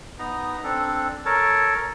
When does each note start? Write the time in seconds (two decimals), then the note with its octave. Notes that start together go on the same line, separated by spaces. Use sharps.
0.19 B3 D#4 A#5
0.64 C4 D4 A4
1.25 A4 A#4 C#5 A5